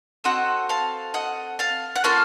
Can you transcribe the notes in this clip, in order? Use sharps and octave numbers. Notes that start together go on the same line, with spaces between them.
C4 F#4 A4 D#5 F#5
F5 A5
D#5 F#5
F5 A5
F#5
A#3 C#4 F4 A4 F5 A5